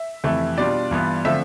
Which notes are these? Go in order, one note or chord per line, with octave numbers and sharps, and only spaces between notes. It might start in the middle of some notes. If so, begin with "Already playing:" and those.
Already playing: E5
F2 C3 E3 A3 E4
B2 G3 D4 F4 D5
G2 E3 B3 F4
D3 F3 A3 C4 E5